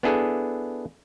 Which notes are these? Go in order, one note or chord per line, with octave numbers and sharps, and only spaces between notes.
B3 D4 E4 G#4 A4